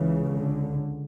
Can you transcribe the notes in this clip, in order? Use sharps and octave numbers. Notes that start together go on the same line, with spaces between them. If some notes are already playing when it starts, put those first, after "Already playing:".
Already playing: C#2 C#3 E3
D3